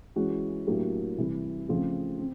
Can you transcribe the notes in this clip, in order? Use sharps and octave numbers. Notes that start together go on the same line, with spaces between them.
E3 G#3 C#4 F#4
A2 F#3 A#3 D4 G4
C3 E3 G3
C#3 F3 A3 C4
C4